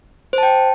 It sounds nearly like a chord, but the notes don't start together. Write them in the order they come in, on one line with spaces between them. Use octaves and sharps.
C5 A5 G5